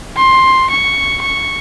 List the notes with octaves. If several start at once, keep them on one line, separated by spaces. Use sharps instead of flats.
C6
C#6
C#6